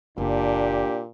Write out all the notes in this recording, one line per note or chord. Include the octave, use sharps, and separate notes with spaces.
F#1 A#2 D4 G4